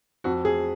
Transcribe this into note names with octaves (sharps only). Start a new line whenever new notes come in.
F2 F#4
G#4